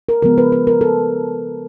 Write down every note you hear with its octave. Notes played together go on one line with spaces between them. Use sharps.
A#4
C#3 F3 G#3 B3 A#4
B4
B4
A#4
A4